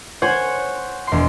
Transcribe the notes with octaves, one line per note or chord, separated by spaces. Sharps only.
C5 C#5 F#5 G#5
E1 C6